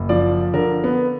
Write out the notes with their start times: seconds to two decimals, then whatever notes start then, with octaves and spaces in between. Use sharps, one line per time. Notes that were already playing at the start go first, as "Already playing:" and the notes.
Already playing: F#1
0.09 F3 D5
0.53 D3 A#4
0.84 B3